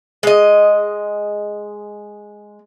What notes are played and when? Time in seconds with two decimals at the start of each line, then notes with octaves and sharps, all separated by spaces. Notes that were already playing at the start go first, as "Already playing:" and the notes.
0.23 G#3 D#5